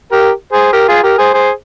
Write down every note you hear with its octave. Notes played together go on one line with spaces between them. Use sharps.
G4 A#4
G#4 C5
G4 A#4
F4 G#4
G4 A#4
G#4 C5
G#4 C5